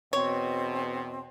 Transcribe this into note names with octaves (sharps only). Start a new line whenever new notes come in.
E2 B2 C4 C#5